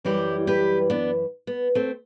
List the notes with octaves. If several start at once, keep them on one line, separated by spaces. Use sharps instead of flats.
F#2 E3 G3 E4 G4
G4 B4
B3 D4
B3
A3 C4